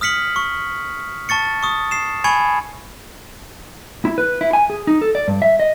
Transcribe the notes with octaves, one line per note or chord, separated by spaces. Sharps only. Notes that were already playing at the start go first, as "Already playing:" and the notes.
D#6 F6 B6 C#7 F#7
C#6
A5 C#6 A6 C#7
C#6 D#6
C7 E7
G#5 B5 C#6 G#6 C#7
E4
B4
E4
G#5
G#4
D#4
A4
D5
G2
E5
D#5